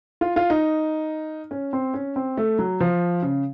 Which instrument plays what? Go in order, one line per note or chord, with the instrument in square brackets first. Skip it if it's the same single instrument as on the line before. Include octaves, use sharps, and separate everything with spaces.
[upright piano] F4
F4
D#4
C#4
C4
C#4
C4
A3
F#3
F3
C#3